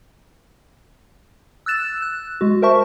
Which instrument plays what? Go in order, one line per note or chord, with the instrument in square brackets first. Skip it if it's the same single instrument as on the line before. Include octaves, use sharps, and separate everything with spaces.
[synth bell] E6 F#6 A6 E7
F#6
G#3 F#4
A#4 C5 E5 A5 C#6